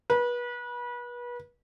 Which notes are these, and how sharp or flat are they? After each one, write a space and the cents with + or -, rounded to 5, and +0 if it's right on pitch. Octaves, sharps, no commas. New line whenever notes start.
B4 -30